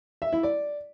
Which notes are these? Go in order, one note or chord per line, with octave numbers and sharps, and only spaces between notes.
E5
E4
D5